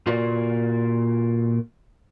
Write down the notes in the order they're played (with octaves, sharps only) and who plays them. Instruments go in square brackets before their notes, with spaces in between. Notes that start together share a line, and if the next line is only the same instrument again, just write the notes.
[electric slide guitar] A#2 F4 F#4 A#4 D5